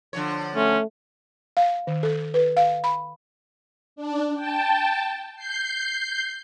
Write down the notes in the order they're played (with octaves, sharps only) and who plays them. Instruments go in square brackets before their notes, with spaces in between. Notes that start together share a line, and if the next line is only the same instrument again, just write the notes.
[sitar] D3 F3 C#5
[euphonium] A3 [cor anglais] C#4
[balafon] F5
D#3
A4
B4
F5
B5
[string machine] D4
G5 A5
G6 C7